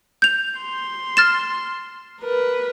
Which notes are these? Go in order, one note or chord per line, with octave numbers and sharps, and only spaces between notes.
G6 F7
C6
F6 A6 E7
A#4 B4